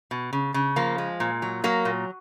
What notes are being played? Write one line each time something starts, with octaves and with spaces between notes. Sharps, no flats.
B2
C#3
C#3
F3 A#3
G#3
A#2
F#3
F#3 A#3
A#2